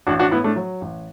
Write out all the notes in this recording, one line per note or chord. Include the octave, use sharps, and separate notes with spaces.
A1 D4 F#4
D4 F#4
A2 B3 E4
A3 D4
F#3
A1